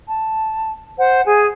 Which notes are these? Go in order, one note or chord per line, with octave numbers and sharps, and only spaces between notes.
A5
C5 F#5
G#4 G#5